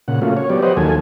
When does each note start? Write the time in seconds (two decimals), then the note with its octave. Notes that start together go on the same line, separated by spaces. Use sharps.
0.08 A#2 C#3 F#5
0.22 A3 A#3 C#4 F4 F#4
0.37 C#5
0.50 F#3 B3 G4 D5
0.62 G4 B4 C5 D#5 F#5
0.77 D#2 F#3 A#3 A4 G#5